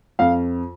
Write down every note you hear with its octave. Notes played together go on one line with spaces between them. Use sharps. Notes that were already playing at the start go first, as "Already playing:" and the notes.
F2 F5